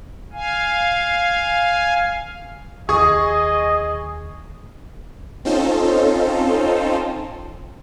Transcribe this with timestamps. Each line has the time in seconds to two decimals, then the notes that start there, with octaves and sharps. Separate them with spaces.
0.33 F5 G#5
2.89 D#2 G#4 D#5 C#6 D#6
5.45 C4 C#4 D#4 F4 A4 C5